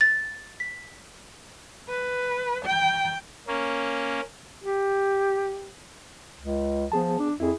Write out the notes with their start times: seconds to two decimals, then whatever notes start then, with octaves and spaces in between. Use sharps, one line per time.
0.01 A6
0.60 B6
1.89 B4
2.66 G5
3.47 A#3 C#4
4.64 G4
6.39 C#2
6.92 F3 B3 G#4 A5
7.19 D4
7.40 F2 E4 G#4